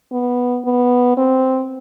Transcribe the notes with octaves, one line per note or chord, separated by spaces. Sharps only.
B3
B3
C4